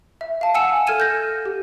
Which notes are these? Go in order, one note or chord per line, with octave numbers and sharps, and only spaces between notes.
E5
F5 A5
F#5 G#5 E6 C#7 E7
A4 F6 G#6 D#7 E7
G6 A#6
G4